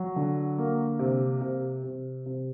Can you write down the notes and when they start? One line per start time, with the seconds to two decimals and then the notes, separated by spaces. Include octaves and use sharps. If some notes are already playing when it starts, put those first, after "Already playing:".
Already playing: F#3
0.16 D3
0.58 A#3
0.99 C3
1.41 C3
1.83 C3
2.26 C3